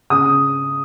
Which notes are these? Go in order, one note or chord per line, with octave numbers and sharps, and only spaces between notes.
C#3 D#6